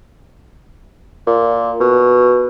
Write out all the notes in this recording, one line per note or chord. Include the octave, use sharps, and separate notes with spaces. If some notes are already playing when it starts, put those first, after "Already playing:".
A#2
B2